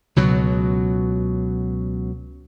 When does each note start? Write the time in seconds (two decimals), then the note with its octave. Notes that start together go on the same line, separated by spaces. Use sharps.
0.16 C#2 B2 F#3